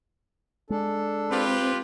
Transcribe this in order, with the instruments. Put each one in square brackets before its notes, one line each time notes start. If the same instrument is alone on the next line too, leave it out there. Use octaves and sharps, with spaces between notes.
[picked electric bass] G#3 [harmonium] D4 A4
[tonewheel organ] C4 [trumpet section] F4 G4 B4